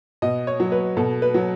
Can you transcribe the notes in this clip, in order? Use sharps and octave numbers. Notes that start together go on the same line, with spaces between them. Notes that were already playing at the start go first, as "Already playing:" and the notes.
B2 D#5
C#5
F#3
B4
B2 A4
B4
F#3